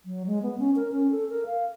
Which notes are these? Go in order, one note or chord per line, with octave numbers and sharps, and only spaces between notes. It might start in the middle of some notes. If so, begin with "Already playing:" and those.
F#3
G#3
B3
C#4
A#4
C#4
A4
A#4
F5